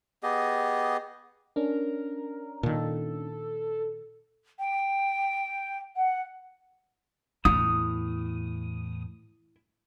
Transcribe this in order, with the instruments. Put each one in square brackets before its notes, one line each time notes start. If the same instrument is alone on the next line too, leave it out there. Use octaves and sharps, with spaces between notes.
[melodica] B3 G4 G#4 D#5
[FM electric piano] C#4 D4 [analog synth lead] A#4
[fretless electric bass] A#2 D#3 [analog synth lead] A4
[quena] G5
F#5
[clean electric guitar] E2 A2 [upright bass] E4 [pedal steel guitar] D#6